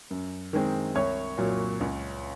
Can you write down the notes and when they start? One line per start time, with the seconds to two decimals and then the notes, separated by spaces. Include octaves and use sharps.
0.11 F#2
0.53 D#3 G#3 C4
0.95 C2 C#5 C#6
1.38 A#2 F#3
1.81 C#2